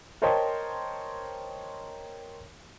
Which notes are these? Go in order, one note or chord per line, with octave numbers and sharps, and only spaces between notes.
A#4 C5 C#5 D#5 G5 A5